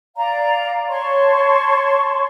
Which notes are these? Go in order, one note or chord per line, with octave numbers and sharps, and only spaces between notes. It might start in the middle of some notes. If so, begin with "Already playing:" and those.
D5 F5 A#5
C#5 A5 C6 C#6